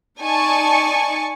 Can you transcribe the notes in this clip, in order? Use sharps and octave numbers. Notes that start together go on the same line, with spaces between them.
D#4 D5 G#5 A5 C#6